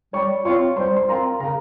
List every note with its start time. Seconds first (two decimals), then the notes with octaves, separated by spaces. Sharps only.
0.13 G3 C#5 C#6
0.45 C4 F4 C#5 C#6
0.77 G3 C5 C6
0.96 C6
1.09 C4 F4 A#4 A#5
1.40 C#3 A#4 A#5